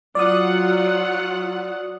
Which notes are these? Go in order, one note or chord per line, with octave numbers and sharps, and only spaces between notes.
F#3 F4 D5 F#5 D#6